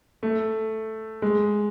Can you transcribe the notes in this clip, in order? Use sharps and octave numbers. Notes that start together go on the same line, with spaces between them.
A3
G#3